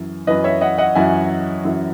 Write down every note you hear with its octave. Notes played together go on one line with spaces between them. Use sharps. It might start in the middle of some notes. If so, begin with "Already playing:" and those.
Already playing: F#2 E3
F#2 E3 B4 D#5
C#5 E5
D#5 F#5
D#5 F#5
F#2 E3 E5 G#5
F#2 E3